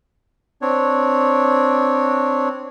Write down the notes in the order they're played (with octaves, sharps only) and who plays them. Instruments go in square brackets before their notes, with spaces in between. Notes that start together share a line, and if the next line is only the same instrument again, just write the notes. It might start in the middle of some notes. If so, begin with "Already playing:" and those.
[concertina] C4 D4 C#5